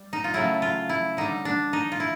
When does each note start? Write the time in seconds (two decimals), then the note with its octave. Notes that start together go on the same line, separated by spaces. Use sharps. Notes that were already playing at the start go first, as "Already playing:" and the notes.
Already playing: G3
0.13 D#4
0.24 F4
0.34 C#3 F#3 A3 E4
0.62 F4
0.89 E4
1.17 D3 G3 D#4
1.45 D4
1.73 D#4
1.92 F4
2.00 E4